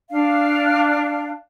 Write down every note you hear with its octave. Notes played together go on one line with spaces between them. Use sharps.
D4 F5